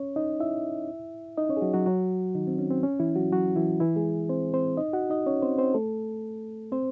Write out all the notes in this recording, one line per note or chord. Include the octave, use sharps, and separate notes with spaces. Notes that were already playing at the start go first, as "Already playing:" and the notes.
Already playing: C#4 C#5
D#4 D#5
E4 E5
D#4 D#5
C#4 C#5
G#4
F#3 F#4
F#3 F#4
F#3 F#4
D#3 D#4
C4
C#4
C4
C#4
E3 E4
F#3 F#4
F#3 F#4
E3 E4
E3 E4
G#3 G#4
C4 C5
C4 C5
D#4 D#5
F#4 F#5
D#4 D#5
C#4 C#5
C4 C5
C4 C5
A3 A4
C4 C5